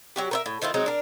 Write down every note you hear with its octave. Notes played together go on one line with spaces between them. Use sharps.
F#3 F#4 G4
A#4 C5 E5
A2
D#3 C4 E4 F4
F#3 G#3 C4 D#4
D4 A#4